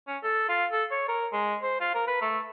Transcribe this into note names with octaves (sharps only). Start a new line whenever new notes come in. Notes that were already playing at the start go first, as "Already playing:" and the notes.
C#4
A4
F4
A4
C#5
A#4
G#3
C5
F4
A#4
B4
A3